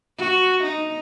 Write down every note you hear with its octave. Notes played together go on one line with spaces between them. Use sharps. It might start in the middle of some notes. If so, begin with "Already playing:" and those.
F#4
D#4